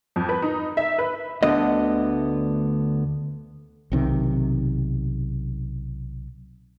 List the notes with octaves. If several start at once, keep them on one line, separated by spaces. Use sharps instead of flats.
F2
B4
D#4
E5
B4
D2 D3 A3 B3 D#5
B1 C3 D#3